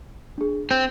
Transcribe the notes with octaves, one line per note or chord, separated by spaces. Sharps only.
D4 G#4
C4 G6